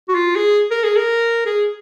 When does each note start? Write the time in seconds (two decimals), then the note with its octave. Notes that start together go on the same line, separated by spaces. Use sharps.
0.08 F#4
0.15 F4
0.36 G#4
0.71 A#4
0.84 G#4
0.96 A#4
1.46 G#4